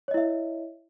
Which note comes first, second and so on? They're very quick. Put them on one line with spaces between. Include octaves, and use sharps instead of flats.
C#5 D#5 E4 E5